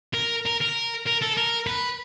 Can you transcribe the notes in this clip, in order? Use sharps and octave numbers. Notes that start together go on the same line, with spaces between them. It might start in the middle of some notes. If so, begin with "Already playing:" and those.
A#4
A#4
A#4
A#4
A4
A#4
B4